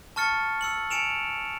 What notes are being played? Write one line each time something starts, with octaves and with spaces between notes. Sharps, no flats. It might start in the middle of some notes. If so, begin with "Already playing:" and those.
A5 C#6 F6 A6 C#7
E6 C#7 F#7
G#5 C#7 D7 E7 F7